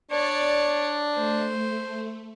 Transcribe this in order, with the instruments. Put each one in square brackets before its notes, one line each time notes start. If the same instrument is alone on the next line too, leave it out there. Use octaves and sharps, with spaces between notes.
[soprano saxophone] D4 [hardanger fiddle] C#5 D5
[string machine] A3 [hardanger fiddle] C5